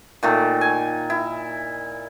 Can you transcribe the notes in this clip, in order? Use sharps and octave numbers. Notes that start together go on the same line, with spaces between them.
A#2 D#3 A3
G#5
E4